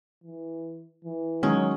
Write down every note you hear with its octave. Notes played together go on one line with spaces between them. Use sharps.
E3
E3
D#3 F#3 G#3 C#4